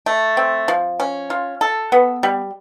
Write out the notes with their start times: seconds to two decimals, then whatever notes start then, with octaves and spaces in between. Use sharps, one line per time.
0.06 A3
0.37 C4
0.68 F3
1.00 C#4
1.30 F4
1.61 A4
1.92 B3
2.23 G3